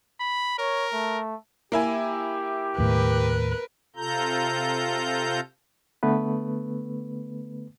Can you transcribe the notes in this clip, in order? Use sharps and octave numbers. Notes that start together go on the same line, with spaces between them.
B5
A#4 C#5
A3
A#3 E4 G4 G#5
D#2 A2 A#4 B4
C3 F4 A4 A#5 G6
D3 A3 B3 B4